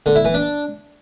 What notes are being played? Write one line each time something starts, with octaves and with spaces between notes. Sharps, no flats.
D3
E4
E3
D4